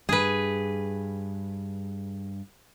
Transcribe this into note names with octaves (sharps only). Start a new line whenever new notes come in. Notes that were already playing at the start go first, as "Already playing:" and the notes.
G2 G#4 B4